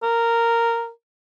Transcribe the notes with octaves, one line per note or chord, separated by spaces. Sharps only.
A#4